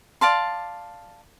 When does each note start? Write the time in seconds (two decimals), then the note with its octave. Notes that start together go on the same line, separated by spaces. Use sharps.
0.21 D5 F5 A5 C6